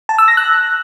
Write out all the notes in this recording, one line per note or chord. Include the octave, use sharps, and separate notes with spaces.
A5
E6
A#6
F#6